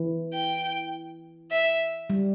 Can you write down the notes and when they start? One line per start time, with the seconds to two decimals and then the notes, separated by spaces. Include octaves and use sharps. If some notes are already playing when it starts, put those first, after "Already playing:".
Already playing: E3
0.34 G5
1.51 E5
2.10 G3